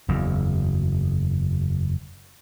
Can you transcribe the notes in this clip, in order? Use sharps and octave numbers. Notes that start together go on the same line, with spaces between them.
F#1 E2